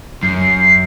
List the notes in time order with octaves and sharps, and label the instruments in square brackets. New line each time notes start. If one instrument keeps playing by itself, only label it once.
[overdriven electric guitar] F#2 [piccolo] C7